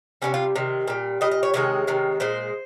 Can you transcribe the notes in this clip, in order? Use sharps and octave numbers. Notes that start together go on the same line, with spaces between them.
C3 D#3 G3 C#4
F4
C3 D#3
A#2 G3
A#2 G3 D#5
D#5
C#5
C3 D#3 G#3 C#5
C3 D#3 G#3
A#2 G#3 C5